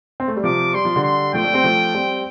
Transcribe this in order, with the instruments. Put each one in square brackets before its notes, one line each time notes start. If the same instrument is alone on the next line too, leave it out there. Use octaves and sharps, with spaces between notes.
[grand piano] C4
A3
G3
[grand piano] C3 F3 [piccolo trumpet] D6
[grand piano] G3 [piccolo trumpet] C6
[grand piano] F3
D3 G3
[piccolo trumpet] C6
[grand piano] F3 A3 [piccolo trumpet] G5
[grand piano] A3 D4
G3 C4
F3 A3
G3 C4